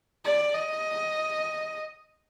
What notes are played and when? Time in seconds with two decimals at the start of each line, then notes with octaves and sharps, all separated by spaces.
0.25 D5
0.54 D#5